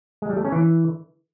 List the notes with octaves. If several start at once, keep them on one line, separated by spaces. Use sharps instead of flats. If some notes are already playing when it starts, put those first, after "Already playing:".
G#3
G3
A3
C#4
E3